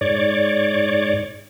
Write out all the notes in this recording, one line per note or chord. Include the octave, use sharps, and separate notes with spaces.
G#2 C#5 D5